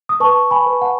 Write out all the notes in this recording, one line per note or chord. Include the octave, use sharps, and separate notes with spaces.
D#6
B4 A5 C#6
G#5 B5
B4
F#5 A5